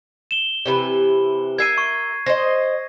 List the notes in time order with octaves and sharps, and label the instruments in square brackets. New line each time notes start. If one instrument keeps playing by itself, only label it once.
[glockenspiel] E7 G7
[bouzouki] C3 E3 B4
[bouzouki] A#4 E5 [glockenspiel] G#6 C7 D#7
[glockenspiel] C#6
[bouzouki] C5 D#5 [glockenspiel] A#6